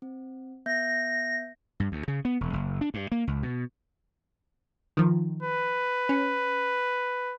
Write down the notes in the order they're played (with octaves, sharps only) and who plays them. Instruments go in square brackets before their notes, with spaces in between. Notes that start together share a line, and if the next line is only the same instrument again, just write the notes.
[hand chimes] C4
[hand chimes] B3 E5 G6 [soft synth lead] A#6
[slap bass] G2
D2
C#3
B3
E1
F#1
D4
G2
A#3
C#2
B2
[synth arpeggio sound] D#3 F3
[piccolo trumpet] B4
[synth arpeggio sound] C#4